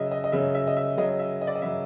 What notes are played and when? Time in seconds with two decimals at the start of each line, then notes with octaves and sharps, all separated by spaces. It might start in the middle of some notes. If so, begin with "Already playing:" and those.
Already playing: C#3 F#3 D#5 E5
0.11 D#5
0.24 D#5
0.32 C#3 F#3 E5
0.55 E5
0.67 D#5
0.77 E5
0.97 C#3 F#3 D#5
1.19 E5
1.41 D#5
1.47 D5
1.55 D#5
1.62 C#3 F#3 E5